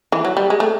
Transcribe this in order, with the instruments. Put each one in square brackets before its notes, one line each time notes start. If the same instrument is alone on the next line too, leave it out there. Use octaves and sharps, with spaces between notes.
[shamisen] E3
F#3
G3
G#3
A3